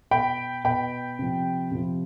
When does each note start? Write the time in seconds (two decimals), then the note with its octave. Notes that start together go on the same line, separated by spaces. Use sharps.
0.11 B2 G5 B5
0.64 B2 G5 B5
1.19 C3 F3
1.72 C3 F3